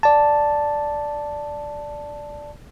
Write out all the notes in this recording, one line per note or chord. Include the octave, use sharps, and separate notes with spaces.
D5 A5